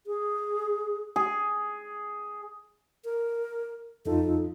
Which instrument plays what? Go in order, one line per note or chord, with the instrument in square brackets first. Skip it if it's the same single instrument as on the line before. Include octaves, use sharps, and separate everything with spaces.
[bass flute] G#4
[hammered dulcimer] G#4
[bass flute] A#4
[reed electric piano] F2 D#4 F4 [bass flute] A4